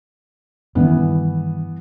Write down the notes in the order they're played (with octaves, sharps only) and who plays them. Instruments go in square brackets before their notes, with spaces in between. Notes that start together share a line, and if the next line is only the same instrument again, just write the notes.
[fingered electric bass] G2 D#3 G3 [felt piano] E3 B3